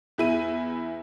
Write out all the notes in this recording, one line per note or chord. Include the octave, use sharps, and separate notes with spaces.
E2 E4 D#7